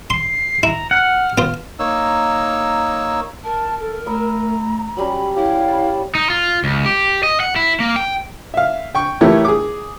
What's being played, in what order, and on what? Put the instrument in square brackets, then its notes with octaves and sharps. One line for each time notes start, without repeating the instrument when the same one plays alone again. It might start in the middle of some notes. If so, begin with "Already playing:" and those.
[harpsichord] C6 [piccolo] C7
[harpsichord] E4 [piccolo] A#5
[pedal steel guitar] F#5 [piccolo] F6
[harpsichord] B3 F4
[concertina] A#3 D#4 C#5 E6
[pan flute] A#4 [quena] A5
[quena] A4
[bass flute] A3 [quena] A#5 [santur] B5 D#6 E6
[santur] F#3 G3 C#4 [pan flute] B5
[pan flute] E4 [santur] G4 [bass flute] C#5 [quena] F5
[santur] A5 B5
[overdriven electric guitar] D#4
F4
C#2
G4
D#5
F#5
E4
A#3
G5
[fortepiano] E5 F5
G5 C#6
E3 A3 E4 G4 A#4 C#5
G#4 D6